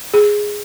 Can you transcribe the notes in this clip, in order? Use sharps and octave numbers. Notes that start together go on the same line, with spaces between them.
G#4